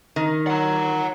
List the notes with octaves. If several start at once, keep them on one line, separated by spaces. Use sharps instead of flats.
D#3
F#5 A#5